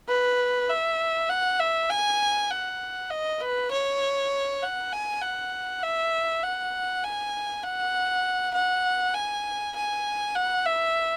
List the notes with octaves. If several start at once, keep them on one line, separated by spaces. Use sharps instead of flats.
B4
E5
F#5
E5
G#5
F#5
D#5
B4
C#5
F#5
G#5
F#5
E5
F#5
G#5
F#5
F#5
G#5
G#5
F#5
E5